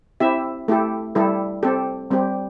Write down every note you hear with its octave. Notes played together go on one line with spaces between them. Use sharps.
C4 E4 G4 E5
A3 E4 G4 A4
G3 E4 G4 A4
C4 G4 A4
G3 C4 G4